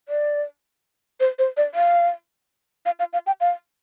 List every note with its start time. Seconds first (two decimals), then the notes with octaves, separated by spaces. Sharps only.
0.09 D5
1.20 C5
1.39 C5
1.57 D5
1.75 F5
2.86 F5
2.99 F5
3.13 F5
3.27 G5
3.41 F5